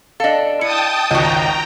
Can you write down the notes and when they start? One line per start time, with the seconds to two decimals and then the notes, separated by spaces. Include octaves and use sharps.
0.20 D4 A4 D#5 F5
0.61 E4 G5 A5 D#6 C#7
1.11 G#1 C#2 F#4 D#5 G5 A#5